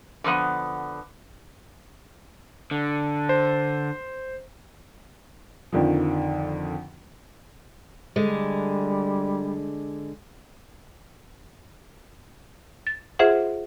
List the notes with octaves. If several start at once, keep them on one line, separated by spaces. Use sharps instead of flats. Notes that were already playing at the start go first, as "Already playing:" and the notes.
D3 F3 A#3 B3
D3
C5
F2 D3 D#3 F3
D3 G3 G#3
A6
F4 G#4 C5 E5 F#5